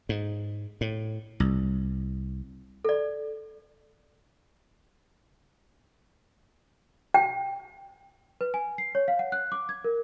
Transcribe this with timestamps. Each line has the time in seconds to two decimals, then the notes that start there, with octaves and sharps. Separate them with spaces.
0.09 G#2
0.81 A2
1.40 C2
2.85 A4 D5
7.14 G5
8.41 B4
8.54 G#5
8.78 C7
8.95 C#5
9.08 F5
9.19 F#5
9.32 F#6
9.52 D6
9.69 G#6
9.84 A#4